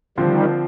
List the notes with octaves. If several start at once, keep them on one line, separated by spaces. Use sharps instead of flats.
D3 D#3 F3 G3 C4 F4